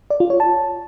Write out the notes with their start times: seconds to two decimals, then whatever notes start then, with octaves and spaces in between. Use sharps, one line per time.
0.10 D5
0.20 F4
0.30 C#5
0.40 A5